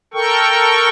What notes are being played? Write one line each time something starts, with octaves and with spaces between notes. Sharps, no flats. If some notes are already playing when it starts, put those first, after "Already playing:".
A4 A#4 G5 C#6